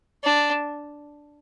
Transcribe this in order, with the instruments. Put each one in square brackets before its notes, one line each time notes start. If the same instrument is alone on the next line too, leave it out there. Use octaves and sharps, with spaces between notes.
[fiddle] D4